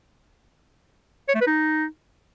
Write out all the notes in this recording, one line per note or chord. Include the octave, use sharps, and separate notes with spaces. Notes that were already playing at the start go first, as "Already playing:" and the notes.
C#5
A3
B4
D#4